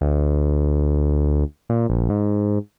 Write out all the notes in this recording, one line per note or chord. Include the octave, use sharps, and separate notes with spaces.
D2
A#2
A#1
G#2